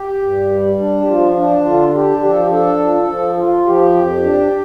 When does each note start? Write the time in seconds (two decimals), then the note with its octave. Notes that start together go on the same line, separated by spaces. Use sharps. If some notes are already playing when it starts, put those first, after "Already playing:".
Already playing: G4
0.22 G2
0.51 G3
0.80 D4
1.02 G4
1.08 F3 F4
1.37 D4
1.65 D3 F4
1.94 D4 G4
2.23 F3 G4
2.30 A4
2.38 G4
2.50 D4 A4
2.80 F3
3.08 F3
3.37 F4
3.66 F3 G4
3.94 F2
4.23 D4